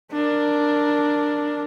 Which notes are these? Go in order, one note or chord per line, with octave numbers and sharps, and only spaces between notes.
D4 A#4